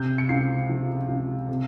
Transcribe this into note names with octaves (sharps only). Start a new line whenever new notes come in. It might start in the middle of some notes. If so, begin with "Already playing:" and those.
Already playing: C3 G6
C#7
C#2 C7
F3
C#2
C3